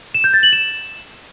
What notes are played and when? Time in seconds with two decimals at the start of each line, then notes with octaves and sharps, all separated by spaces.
0.14 E7
0.24 G6
0.34 A6
0.43 F#7
0.53 E7